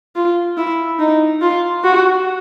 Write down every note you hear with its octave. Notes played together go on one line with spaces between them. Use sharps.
F4
E4
D#4
F4
F#4